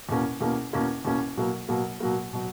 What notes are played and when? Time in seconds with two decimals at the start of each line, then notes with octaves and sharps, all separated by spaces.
0.09 E2 B2 A#3 C#4
0.41 E2 B2 A#3 C#4
0.73 E2 B2 A#3 C#4
1.05 E2 B2 A#3 C#4
1.37 B2 F#3 A#3
1.69 B2 F#3 A#3
2.00 B2 F#3 A#3
2.33 B2 F#3